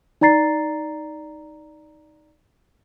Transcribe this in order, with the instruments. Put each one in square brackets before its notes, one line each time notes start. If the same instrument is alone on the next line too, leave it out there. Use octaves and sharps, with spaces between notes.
[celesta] D#4 D5 A#5 A6 C7